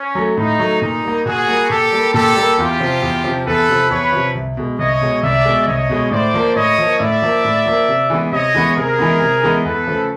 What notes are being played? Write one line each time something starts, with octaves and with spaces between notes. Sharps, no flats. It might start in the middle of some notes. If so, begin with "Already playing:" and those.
Already playing: C#4
F#3 A3
A2 D#4
F#3 A3
A#2 D#4
G3 A#3
A#2 F#4 G#4
G3 A#3
A#2 G4 A4
G3 A#3
A#2 G4 A4
G3 A#3
E2 F4 G4
C3 F3
E2
C3 F3
E2 A4 B4
C3 F3
E2 B4 C#5
C3 F3
C2
B2 G#3
C2 C#5 D#5
B2 G#3
C2 D5 E5
B2 G#3
C2 C#5 D#5
B2 G#3
A2 C5 D5
F3 A#3
A2 C#5 D#5
F3 A#3
A2 D5 E5
F3 A#3
A2
F3 A#3
C3
E3 G#3 B3
C3 C#5 D#5
E3 G#3 B3
C3 G#4 A#4
E3 G#3 B3
C3
E3 G#3 B3
E2 A4 B4
C#3 F3 A3